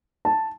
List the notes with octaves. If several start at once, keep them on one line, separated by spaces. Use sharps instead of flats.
A5